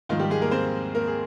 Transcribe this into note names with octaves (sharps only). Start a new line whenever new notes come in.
G#2 D#3 F3 F4
G3 G4
G#3 G#4
A#3 A#4
C4 C5
A#3 A#4
G#4